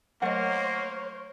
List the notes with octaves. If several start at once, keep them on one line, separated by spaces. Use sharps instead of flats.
F#3 A3 A#3 A#4 C5 C#5 D#5 F#5